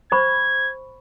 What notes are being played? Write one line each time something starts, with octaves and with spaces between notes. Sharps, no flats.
C5 B5 C#6 G#6